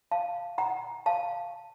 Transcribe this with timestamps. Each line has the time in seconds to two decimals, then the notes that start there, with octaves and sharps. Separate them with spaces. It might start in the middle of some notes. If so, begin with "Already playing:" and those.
0.11 F5 A5
0.58 F#5 A#5
1.06 F5 A5